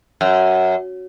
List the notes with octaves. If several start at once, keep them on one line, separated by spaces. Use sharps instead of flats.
F#2